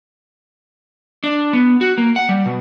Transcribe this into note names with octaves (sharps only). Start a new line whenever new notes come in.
D4
B3
F#4
A#3
F#5
G3
B2